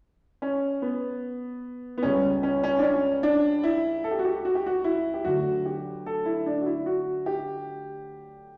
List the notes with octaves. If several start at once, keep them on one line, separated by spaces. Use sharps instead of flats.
C#4
B3
B3
C#2 C#3 G3 C#4
C#4
C#4
D4
C#4
D4
E4
A4
G4
F#4
G4
F#4
G4
F#4
E4
G4
D2 D3 F#3 F#4
G4
A4
E4
D4
F#4
E4
F#4
G4